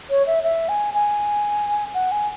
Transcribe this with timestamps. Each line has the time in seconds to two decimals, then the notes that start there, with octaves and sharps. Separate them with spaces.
0.10 C#5
0.27 E5
0.44 E5
0.69 G#5
0.94 G#5
1.94 F#5
2.12 G#5